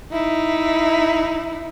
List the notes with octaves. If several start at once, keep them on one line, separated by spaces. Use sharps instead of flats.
D#4 E4